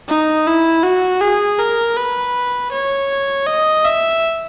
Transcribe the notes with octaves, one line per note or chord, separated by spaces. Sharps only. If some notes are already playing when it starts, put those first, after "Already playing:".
D#4
E4
F#4
G#4
A#4
B4
C#5
D#5
E5